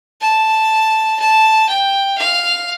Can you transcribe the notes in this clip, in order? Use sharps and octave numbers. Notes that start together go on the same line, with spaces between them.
A5
A5
G5
F5